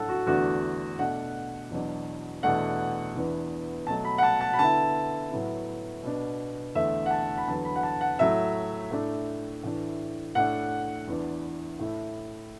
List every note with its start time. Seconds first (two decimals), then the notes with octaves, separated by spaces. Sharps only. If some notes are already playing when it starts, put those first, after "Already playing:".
Already playing: A2 F#3 D4 A4 F#5 A5
0.09 F#4
0.26 E2 D3 A3 D4 F#4
0.99 B2 A3 D4 F#5
1.71 E2 B2 F#3 D4
2.43 E2 B2 A3 D4 F#5
3.15 E2 E3 B3 D4
3.87 B2 F#3 A3 A5
4.05 B5
4.18 F#5
4.23 A5
4.41 A5
4.53 B5
4.59 D3 B3 E4 A5
5.31 A2 F#3 B3 E4
6.03 B2 B3 D4
6.75 E2 D3 A3 E5
7.06 F#5
7.11 A5
7.37 B5
7.47 E2 D3 F#3 B3 A5
7.65 B5
7.76 F#5
7.83 A5
8.01 F#5
8.19 A2 F#3 A3 E4 E5
8.91 A2 A3 D4
9.63 A2 E3 D4
10.35 A2 A3 D4 F#5
11.07 E2 E3 D4
11.79 A2 A3 E4